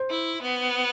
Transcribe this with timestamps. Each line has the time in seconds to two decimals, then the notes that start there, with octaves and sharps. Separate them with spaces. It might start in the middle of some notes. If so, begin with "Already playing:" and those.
Already playing: C5
0.10 E4
0.42 B3